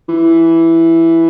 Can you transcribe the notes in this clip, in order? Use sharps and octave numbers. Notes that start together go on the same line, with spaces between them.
E3